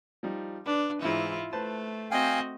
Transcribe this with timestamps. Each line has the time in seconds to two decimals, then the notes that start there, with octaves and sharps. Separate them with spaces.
0.23 F3 G3 D#4
0.66 D4 B4
1.02 G#2 E3 E4 F4
1.53 A3 B4 C5 A5
2.11 C4 F#4 D#5 F5 G5 G#5